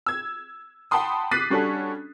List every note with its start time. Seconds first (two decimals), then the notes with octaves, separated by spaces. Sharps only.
0.06 E6 G#6
0.91 F#5 G5 A5 B5 C6 D#6
1.31 D6 F#6 A6 B6 C7 D#7
1.50 G3 C#4 D4 F#4 A4